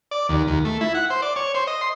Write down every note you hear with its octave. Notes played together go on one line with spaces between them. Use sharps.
D5
D#2
D#2
A3
E4
F#5
C5
D5
C#5
C5
D#5
C6